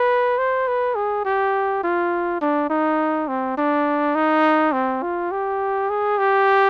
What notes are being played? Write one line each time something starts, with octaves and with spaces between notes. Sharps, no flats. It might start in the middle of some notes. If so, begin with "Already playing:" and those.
Already playing: B4
C5
B4
G#4
G4
F4
D4
D#4
C4
D4
D#4
C4
F4
G4
G#4
G4